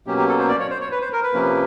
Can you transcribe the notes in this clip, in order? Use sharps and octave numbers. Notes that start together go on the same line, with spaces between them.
B2 F#3 A#3 C#4 G4
G4
A4
C5
D5
C#5
C5
C#5
B4
C5
A#4
B4
C3 F3 A#3 C#4